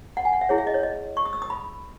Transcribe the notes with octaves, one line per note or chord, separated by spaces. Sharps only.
F#5
G#5
F#5
E5
E4 G#4 C#5
E5
D#5
C#5
D#5
C#6
D#6
E6
D#6
B5